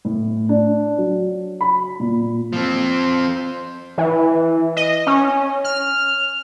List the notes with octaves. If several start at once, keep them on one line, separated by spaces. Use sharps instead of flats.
A2
D4
F#3
B5
A#2
F3 C4
E3
D#5
C#4
F6